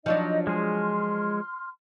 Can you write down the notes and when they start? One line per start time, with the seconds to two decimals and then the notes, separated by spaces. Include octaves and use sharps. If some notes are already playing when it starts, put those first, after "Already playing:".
0.06 F3 F#3 D4 D#4 D#5
0.47 G#3 G#4 C6 F6